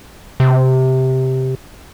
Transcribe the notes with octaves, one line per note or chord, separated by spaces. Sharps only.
C3